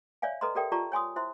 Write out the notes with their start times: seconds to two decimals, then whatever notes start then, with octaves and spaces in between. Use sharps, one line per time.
0.22 C#5 D5 E5 F5 G#5
0.41 A4 B4 D#5 A#5 C6
0.55 G4 A4 A#4 D5 E5 G5
0.72 F4 G4 D5 A5 A#5 C#6
0.92 C#5 G#5 C6 D#6
1.16 E4 C5 E5 C6